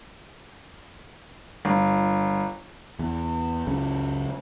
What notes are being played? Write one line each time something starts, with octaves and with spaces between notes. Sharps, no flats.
G1
E2
C#2 F#2 C#3